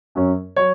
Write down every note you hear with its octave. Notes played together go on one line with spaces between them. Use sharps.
F#2 F#3 C#4
F#3 C#5